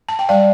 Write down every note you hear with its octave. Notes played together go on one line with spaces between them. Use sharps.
A5
G5
G3 D5 F5